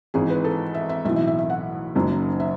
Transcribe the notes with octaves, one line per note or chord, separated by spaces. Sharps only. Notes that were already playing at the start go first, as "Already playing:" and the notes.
G#1 G#2 E3 G#4
B4
A4
E5
E5
B1 A2 E3 E5
E5
E5
E5
F#5
F#1 F#2 D#3 F#3
E5